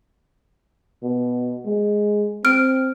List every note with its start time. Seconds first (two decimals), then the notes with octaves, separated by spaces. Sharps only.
1.03 B2
1.65 G#3
2.45 C4 F6 D7